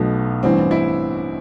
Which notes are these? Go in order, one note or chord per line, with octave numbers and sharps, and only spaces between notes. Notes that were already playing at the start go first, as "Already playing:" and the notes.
Already playing: B1 B2 A3 B3
A1 G2 E3 C4
E4